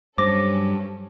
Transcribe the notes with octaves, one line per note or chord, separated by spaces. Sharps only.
G2 F#3 C#4 A4 C5 D6 A#6